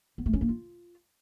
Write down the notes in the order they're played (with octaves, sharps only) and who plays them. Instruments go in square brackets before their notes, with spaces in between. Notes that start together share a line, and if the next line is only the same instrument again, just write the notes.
[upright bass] B3
A3
C#4
A#3
F4